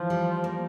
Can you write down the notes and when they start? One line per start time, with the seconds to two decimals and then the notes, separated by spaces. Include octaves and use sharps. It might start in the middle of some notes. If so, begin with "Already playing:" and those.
Already playing: E3 F3
0.10 G3
0.44 A#3